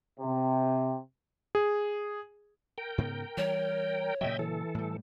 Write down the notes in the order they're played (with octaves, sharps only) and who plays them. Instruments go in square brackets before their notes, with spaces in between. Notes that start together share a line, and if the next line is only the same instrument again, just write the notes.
[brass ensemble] C3
[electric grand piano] G#4
[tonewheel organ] A#4 G5
[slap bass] G#2 C#3 B3
[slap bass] E3 G3 [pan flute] C#5
[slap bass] A#2 C#3 F#3 [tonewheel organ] D#5 E5 G5
[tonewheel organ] E3 A4
[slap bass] A2 G3